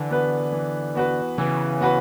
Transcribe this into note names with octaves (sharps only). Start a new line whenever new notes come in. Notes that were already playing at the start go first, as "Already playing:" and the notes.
Already playing: D3 E3
B3 F#4 B4
E3
B3 F#4 B4
C#3 E3
B3 F#4 B4